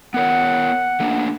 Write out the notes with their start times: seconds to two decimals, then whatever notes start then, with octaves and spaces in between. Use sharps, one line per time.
0.14 B3 A#4 C#5 F#5
1.00 A3 A#3 D4